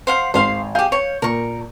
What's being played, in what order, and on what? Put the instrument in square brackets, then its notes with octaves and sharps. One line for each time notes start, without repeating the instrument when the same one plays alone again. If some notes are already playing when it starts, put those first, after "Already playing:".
[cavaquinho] C5 F5 F#5
[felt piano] G#1 [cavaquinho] C5 F5 C6
[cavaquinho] G4 G#4 [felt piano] F5 G6
[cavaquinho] C#5
[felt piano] A#2 [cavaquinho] A#4 C#6